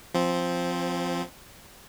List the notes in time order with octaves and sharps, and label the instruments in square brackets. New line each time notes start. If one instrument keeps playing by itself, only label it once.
[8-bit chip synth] F3 C4